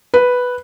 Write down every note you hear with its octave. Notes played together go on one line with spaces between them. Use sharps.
B4